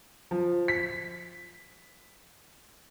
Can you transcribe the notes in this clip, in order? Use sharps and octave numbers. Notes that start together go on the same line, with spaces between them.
F3
B6